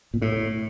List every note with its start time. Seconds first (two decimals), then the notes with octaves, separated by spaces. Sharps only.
0.14 A#2
0.22 A2